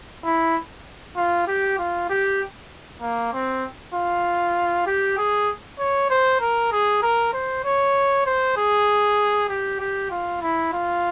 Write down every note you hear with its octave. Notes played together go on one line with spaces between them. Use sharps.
E4
F4
G4
F4
G4
A#3
C4
F4
G4
G#4
C#5
C5
A#4
G#4
A#4
C5
C#5
C5
G#4
G4
G4
F4
E4
F4